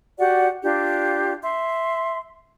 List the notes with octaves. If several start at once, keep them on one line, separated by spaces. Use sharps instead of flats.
F#4 G4 D5 F#5
D4 F4 G4
E5 C6